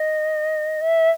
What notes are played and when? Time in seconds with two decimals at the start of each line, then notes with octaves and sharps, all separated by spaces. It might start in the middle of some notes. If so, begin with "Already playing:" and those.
Already playing: D#5
0.81 E5